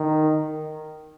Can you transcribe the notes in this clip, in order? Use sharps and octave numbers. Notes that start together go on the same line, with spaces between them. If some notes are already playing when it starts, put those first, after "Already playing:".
Already playing: D#3